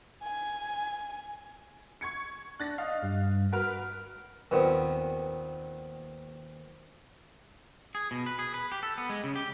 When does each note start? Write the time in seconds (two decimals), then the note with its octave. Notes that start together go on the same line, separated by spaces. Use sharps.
0.23 G#5
2.01 C#6 G#6 C#7
2.60 D4 F#6 A6 A#6
2.78 D#5 F5
3.03 G2
3.52 F#4 A#4 B4 F6
4.51 D#2 A#2 B3 C4
7.95 G#4
8.11 B2
8.26 B4
8.39 G#4
8.54 B4
8.72 G4
8.83 A4
8.98 B3
9.09 G#3
9.24 C#3
9.36 G4